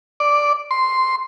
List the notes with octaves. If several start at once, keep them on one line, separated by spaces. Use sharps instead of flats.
D5
C6